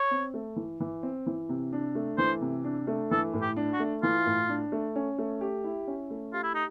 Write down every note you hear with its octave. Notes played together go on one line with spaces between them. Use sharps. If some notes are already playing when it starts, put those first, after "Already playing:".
Already playing: C#5
C4
A3
E3
E3
C4
E3
C3
D4
A3
E3 C5
C3
D4
A3
E3 A4
A2
G4
D4
F#4
A3
E3 F4
A2
D4
A3
C#4
A3
G4
E4
C#4
A3
F4 G4
E4
D#4